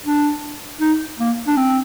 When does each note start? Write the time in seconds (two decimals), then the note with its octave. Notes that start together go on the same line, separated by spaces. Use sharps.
0.05 D4
0.81 D#4
1.19 A#3
1.47 D4
1.57 C4